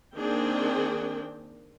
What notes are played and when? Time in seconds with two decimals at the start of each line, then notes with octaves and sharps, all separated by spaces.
0.17 D#3 A#3 C4 D4 G#4 G5